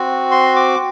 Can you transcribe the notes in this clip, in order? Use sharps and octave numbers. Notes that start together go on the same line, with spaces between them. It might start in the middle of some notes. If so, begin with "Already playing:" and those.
Already playing: C4 F#4
C6
D6